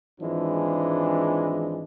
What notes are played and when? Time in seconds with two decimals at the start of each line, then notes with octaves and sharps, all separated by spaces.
0.20 G#1 E3 F3 G#3 D4